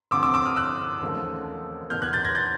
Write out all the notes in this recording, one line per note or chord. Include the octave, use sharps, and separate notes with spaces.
D2 C3 F3 D6 E6
D6 E6
D6 E6
D#6 F6
E6 F#6
E1 D#2 C#3 F3 A3
F#1 E2 B2 F6 G6
F#6 G#6
G6 A6
G#6 A#6
G6 A6